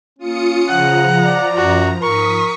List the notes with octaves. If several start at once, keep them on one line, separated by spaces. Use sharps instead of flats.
A#3 C#4 F4 D#6 C#7
C#3 F3 F#5 A#5
D5
F#2 F#4
G#2 A#4 C#6 D#6 B6